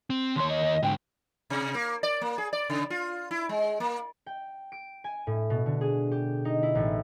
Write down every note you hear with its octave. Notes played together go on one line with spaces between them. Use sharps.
C4
D#2 C#5 C6
D#5
G#2 D3 G5
C3
A#3
D5
A#3
G#4
D5
C#3
F4
E4
G#3
A#3
G5
D7
G#5
A2
B2
D3
G#4
G4
D#4
E4
A1